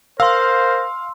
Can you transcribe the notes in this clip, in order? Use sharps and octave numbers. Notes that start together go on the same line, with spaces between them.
A#4 C5 F5 C6 E6